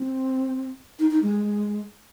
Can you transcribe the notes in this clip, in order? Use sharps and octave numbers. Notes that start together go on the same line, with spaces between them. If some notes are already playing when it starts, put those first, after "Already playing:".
Already playing: C4
D#4
D#4
G#3